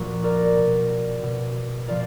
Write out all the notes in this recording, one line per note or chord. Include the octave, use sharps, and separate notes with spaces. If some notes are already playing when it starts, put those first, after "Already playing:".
Already playing: A#2 F3 F#4
A#4 D5
B2
B2
A#2 F3 D5 F5